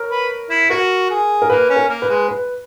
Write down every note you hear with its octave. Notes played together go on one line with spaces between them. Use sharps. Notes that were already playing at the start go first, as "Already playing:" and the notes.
Already playing: A#4 C#5
B4
E4
F#4 A#4
G#4
A#4
A#3 B4
C#4
A#4
A#3
B4
G#3
B4